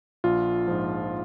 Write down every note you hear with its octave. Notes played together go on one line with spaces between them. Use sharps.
A#1 F4
G#2 F3